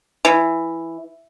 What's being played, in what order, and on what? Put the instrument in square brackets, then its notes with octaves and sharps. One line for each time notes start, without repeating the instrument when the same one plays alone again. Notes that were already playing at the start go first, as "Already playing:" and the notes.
[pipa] E3